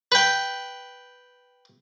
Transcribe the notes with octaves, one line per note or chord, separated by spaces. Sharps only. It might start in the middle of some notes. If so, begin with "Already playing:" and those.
B4 G5